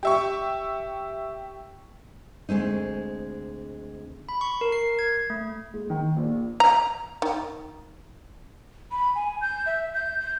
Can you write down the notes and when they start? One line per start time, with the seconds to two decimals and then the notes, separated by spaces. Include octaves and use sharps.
0.03 G4 E5 C#6
2.49 D2 G2 G#3 C4 D#4
4.29 B5
4.41 C#6
4.61 A#4
4.72 C7
4.99 G#6
5.30 A3
5.74 G#3
5.90 D#3
6.17 A#1
6.60 A#5
7.22 D#3
8.91 B5
9.15 G#5
9.41 G6
9.66 E5
9.94 G6
10.20 G6